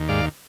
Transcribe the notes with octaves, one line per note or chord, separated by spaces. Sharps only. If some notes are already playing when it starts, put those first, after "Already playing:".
Already playing: D#2
G#2 D5 F5